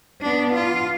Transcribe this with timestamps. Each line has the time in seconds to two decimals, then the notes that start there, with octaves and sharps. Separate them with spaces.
0.21 B3 D4
0.55 F4